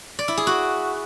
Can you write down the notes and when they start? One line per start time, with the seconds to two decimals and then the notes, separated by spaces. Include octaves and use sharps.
0.19 D5
0.28 E4
0.37 G#4
0.47 F#4